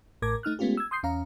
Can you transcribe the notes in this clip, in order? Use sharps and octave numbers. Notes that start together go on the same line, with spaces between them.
A1 A2 A#4 D6 G#6
A3 D#4 F6 F#6
G#3 A3 B3 C#4 F4 G4
E6 G#6
C6 D#6 G6 C7
E2 C#4 F5 A#5